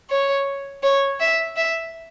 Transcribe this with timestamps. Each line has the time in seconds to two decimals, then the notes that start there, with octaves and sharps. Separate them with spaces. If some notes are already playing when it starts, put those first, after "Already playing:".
0.10 C#5
0.83 C#5
1.20 E5
1.57 E5